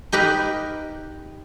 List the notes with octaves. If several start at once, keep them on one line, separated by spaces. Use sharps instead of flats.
D#4 G4 A#4 B4